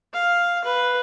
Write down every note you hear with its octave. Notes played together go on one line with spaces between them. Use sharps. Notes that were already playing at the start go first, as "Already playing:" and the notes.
F5
B4